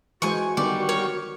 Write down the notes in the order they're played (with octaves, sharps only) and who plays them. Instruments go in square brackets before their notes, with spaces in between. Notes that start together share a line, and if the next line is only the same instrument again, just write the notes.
[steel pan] E3 G#3 C5 [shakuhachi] F#4 [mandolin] G#5 C#6
[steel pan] D3 D#3 B3 [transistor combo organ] G3 C#6 [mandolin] D5
[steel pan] A#4 [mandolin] C#5